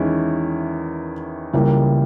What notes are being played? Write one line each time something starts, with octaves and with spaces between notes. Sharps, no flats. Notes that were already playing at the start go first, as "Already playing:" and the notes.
Already playing: E2 D#3 G#3 C#4 E4
C#2 C#3 E3 G3 A#3